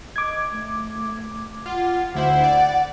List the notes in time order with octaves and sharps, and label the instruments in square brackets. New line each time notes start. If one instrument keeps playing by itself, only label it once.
[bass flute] D#5 [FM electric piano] D6 G#6
[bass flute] A3
[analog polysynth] F4 [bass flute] F#5
[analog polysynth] D2 E4 C5 [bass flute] F#5
[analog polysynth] D5